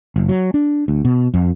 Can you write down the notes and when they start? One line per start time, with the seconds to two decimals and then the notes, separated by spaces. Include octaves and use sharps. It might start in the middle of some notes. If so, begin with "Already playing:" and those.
0.16 F#1
0.29 F#3
0.54 D4
0.88 D2
1.05 B2
1.34 F2